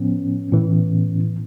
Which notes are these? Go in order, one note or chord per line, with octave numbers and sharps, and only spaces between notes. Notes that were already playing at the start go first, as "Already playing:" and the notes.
Already playing: A2 F3 B3 C#4
A2 E3